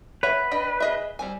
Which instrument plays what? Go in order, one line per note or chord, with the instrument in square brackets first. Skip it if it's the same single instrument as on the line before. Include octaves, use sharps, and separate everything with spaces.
[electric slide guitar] B4 [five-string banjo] C#5 E5 F#5
[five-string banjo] D4 D#5 G5
G#4 D#5 E5
G3 C4 G#5